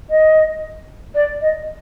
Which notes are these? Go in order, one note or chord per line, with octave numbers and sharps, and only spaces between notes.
D#5
D5
D#5